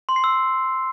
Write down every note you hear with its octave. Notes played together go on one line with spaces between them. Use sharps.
C6
C7
E6